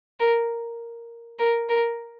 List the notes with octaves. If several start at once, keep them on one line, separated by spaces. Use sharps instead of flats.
A#4
A#4
A#4